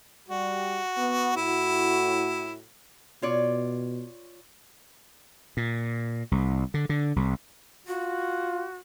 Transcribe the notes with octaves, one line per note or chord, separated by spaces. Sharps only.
G3 F#4
B3
A2 E4 F#4
B2 F4 C#5 D5
A#2
C2
D3
D3
C2
F4 F#4